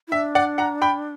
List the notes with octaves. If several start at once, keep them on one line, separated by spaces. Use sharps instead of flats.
E4
D4 E5
D5 F#5
F#5 A#5
G5 B5